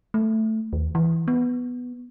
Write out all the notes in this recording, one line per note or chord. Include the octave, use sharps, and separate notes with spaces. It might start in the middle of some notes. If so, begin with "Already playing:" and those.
A3
D#2
E3
B3